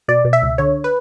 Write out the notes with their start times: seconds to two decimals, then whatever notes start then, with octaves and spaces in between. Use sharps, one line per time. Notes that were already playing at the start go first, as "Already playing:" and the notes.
0.08 B2 D5
0.25 B2
0.33 E5
0.42 C#2
0.58 D3 C#5
0.84 B4